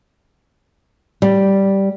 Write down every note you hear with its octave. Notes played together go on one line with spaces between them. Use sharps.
G3